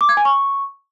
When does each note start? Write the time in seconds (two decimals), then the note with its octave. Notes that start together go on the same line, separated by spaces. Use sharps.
0.01 D6
0.09 G#6
0.17 G#5
0.25 C#6